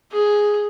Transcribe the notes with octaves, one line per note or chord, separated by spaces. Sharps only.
G#4